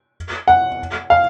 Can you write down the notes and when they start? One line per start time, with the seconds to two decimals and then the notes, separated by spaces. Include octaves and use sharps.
0.48 F#5
1.10 F5